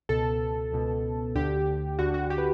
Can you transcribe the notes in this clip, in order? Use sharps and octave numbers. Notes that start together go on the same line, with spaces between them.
C#2 B2 A4
C#2 B2
D2 D3 G4
D2 D3 F#4
F#4
G4
B4